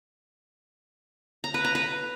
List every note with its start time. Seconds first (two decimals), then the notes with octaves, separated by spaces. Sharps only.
1.44 A#5
1.54 B4
1.65 A#5
1.75 B4